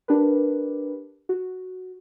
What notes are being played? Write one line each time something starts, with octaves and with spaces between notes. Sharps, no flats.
D4 G4 A#4 B4
F#4